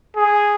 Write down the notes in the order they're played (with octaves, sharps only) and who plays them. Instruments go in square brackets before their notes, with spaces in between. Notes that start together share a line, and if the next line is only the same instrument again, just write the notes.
[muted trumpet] G#4